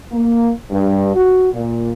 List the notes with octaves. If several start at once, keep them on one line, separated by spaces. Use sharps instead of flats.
A#3
G2
F#4
A#2